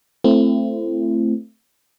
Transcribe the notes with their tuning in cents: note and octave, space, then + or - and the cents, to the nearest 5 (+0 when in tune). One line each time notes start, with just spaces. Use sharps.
A3 +5 C4 +0 E4 +35